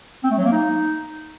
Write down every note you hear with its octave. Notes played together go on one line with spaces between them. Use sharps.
C4
A3
F#3
A#3
D#4